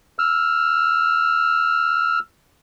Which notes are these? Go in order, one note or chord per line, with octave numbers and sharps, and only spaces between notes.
E6 F6